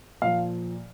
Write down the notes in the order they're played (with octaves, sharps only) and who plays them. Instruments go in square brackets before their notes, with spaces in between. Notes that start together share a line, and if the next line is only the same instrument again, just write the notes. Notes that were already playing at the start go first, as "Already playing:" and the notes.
[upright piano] A#2 F3 F5